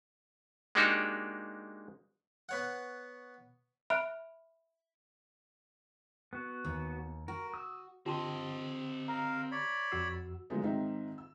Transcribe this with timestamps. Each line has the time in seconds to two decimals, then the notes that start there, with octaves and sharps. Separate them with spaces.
0.75 G#3 A#3 D4 D#4 F#4 G4
2.49 B3 C#5 F#5
3.90 E5 B5 F6 F#6 D7
6.33 B3 F#4
6.65 D#2
7.28 F#4 A#4
7.54 D#6 E6
8.06 D3 C4 F4 G4 D#5 A5 C6
9.08 A#4 F5 A#5
9.51 C#5 D5 B5
9.92 F2 F#4 E6 C7
10.50 D3 F3 F#3 G#3 A3 B3
10.61 G#2 D#3 C4 D#4 E5
11.18 E6